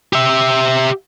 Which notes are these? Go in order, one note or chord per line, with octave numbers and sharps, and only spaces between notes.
G4 E5